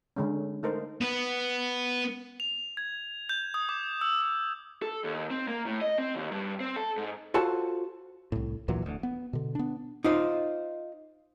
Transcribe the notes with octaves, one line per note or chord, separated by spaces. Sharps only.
D3 G#3 C#4
A3 D#4 A#4 C5
B3 B4
F7
G#6
G6
D#6
D6
E6
E6
A4
D#2
C4
A#3
A2
D#5
C4
D#2
G2
C4
A4
G#2
F4 F#4 A4 C5 F#5 A5
C2 A2
D2 A#2 E3 F#3
D1 D2
B3
B2 D3
B3 D4
D#4 F4 C5